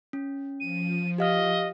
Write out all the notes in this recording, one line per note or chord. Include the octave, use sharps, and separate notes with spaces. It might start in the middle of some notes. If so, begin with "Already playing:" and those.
C#4
F3 D#7
G4 D#5 F5 F6